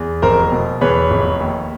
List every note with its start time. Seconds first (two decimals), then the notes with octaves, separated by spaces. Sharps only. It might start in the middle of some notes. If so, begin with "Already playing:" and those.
Already playing: E2
0.22 F1 A#4 C5
0.52 B2
0.81 E2 B4 C#5
1.11 F1
1.40 D#2